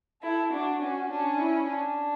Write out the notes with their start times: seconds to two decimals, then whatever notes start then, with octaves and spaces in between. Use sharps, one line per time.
0.22 E4 A4
0.52 D4 F#4
0.81 C#4 F#4
1.10 C#4 D4
1.39 E4
1.68 D4